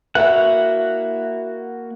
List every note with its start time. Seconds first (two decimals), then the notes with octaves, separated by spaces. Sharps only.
0.15 A#3 E4 F#4 B4 E5 F#5